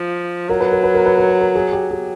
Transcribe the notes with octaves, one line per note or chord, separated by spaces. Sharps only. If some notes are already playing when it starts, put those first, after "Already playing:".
Already playing: F3
F#3 A#4
B4
A#4
B4
A#4
B4
A#4
B4
A#4
G#4
G4
G#4